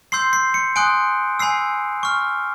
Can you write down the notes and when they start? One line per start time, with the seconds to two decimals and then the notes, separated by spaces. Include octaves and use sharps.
0.12 C6 E6 G6 C7
0.33 C7
0.54 C#7
0.76 G#5 C6 D#6 F#6 D7
1.39 G#5 B5 E6 C7
2.03 C#6 F6